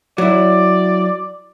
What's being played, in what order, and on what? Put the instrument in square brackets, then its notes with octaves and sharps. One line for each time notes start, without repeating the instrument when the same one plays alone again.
[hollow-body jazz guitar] F#3 E4 [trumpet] D5